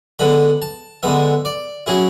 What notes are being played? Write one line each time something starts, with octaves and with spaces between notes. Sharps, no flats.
D3 G#3 B3 B5
A5
D3 G#3 B3 E5
D5
F#3 C#4 E4 G#4